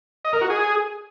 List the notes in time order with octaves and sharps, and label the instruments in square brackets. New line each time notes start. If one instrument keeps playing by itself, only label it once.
[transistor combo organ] D#5
A#4
F#4
G#4